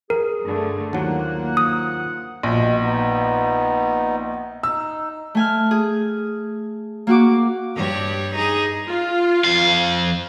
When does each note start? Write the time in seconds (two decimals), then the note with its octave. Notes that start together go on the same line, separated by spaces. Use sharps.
0.10 G#4 A#4
0.44 G2 D3 A3
0.93 D#2 F#3 A#3 F4 C5 F#5
1.57 D#6
2.43 A#1 B2
2.80 B3 D#4
4.63 D#4 E6
5.35 A3 G#5 F6
5.71 G#4
7.07 A#3 F#4 D6
7.75 G2 G3 C#5
8.35 D#4 G#4
8.88 F4
9.45 F2 F5